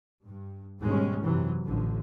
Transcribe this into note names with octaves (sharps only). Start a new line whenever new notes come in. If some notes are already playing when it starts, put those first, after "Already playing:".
G2
D#2 G#2 B2 G3 G#3 C#4
F#2 C3 E3 F#3
A1 D3 F3